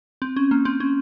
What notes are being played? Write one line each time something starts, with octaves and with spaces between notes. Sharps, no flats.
C4
C#4
A#3
C4
C#4